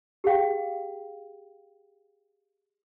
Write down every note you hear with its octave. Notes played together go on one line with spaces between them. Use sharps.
G4 G#4 F5 G5